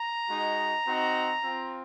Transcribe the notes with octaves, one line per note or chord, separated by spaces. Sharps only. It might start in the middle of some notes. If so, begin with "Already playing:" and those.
Already playing: A#5
G#3 D#4 F#4
C4 D#4 F#4
C4 F4